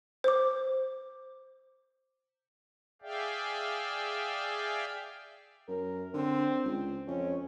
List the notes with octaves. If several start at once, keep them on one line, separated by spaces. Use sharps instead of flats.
C5 D6
G#4 D5 E5 F5 G5
F#2 A#4
D3 C4
C#2
F2 C#4